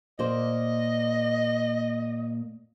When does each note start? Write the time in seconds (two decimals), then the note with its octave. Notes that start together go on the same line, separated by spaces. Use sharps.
0.19 A#2 A#3 C5 D#5